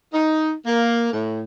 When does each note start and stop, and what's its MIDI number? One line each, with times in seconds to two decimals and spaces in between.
0.14 0.53 63
0.66 1.11 58
1.13 1.44 45